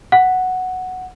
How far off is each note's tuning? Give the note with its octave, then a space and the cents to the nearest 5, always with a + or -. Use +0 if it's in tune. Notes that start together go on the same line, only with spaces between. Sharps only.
F#5 +0